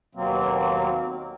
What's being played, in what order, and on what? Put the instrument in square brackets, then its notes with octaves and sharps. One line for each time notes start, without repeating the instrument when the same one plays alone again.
[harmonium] D#2 B2 F#3 A#3 C4